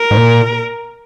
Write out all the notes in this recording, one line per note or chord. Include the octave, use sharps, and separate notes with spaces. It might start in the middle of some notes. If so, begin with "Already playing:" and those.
Already playing: A#4
G#2
A#2